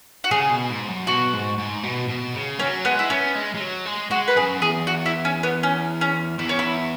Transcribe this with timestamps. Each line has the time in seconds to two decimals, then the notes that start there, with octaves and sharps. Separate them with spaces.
0.24 F#4
0.31 C#3 G#4
0.50 B2
0.70 G#2
0.88 F#2
1.07 B2 F#4
1.33 G#2
1.58 G#2
1.83 B2
2.08 B2
2.34 C#3
2.58 F#3 C#4
2.85 G#3 B3
2.99 E4
3.10 B3 C#4
3.35 G#3
3.55 G#3
3.60 F#3
3.86 G#3
4.11 G#3 F#4
4.28 B4
4.36 F#2 G#4
4.61 E2 G#4
4.87 F#4
5.06 E4
5.25 C#4
5.43 B3
5.63 C#4
6.01 C#4
6.39 E2 E4
6.49 C#4
6.59 E4